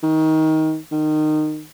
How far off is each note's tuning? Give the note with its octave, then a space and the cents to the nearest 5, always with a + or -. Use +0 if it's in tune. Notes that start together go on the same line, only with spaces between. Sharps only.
D#3 +20
D#3 -20